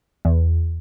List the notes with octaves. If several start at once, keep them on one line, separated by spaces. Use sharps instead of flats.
E2